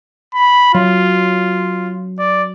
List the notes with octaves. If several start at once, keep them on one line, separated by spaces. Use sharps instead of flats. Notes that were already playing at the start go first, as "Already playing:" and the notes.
B5
F#3 F4
D5